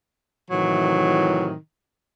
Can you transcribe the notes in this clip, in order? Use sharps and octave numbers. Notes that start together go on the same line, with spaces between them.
A2 C3 D#3 E3 F#3